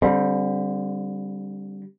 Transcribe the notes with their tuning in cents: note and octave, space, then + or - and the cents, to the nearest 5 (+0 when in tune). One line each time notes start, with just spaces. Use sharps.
D3 -25 G3 +0 C4 +0